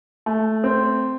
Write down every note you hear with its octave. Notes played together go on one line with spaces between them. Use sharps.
A3
C4